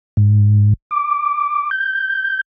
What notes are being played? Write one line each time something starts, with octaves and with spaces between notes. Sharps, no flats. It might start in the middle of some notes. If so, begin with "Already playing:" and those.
G#2
D6
G6